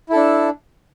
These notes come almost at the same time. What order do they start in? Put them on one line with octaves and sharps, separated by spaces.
E4 A4 D4